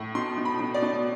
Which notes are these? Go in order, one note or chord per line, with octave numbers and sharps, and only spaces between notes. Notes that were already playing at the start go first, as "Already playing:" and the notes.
Already playing: A2
B2 C6
B2
B5
B2
D5
B2